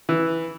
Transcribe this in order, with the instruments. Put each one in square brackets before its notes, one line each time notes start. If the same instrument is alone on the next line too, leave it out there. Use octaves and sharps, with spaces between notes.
[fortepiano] E3